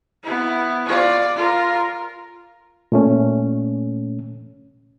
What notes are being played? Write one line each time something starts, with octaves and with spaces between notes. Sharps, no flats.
B3 E4
F4 D5
F4 A#4
A#2 A3 C#4